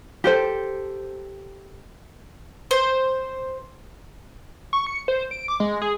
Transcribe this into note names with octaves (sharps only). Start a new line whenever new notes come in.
G4 A4 C5
C5
C#6
C#7
C5
D7
D6
G#3
G#4